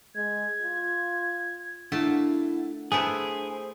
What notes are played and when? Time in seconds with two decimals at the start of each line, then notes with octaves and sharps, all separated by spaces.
0.15 G#3 G#6
0.62 F4
1.92 A3 A#3 D4 E4 F#5 A5
2.92 A3 B3 E4 G#4 C5